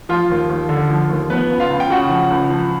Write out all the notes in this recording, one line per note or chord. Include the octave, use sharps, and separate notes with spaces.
F3 F4
D#2
D#2
D3
F3
D#2
F3 B3 B4
C#2
F4 F5
C#2
G5
C#3 F#4 F#5
F3
C#2
F3